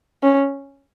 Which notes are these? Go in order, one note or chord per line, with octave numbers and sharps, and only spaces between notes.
C#4